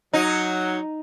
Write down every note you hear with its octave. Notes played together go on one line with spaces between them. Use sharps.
F#3 D#4